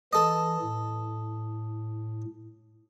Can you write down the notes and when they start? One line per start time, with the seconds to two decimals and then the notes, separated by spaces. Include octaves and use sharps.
0.13 E3 A4 D#5
0.62 A2